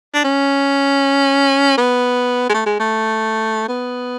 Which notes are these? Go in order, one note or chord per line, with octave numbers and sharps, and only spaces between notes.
D4
C#4
B3
G#3
A3
G#3
A3
B3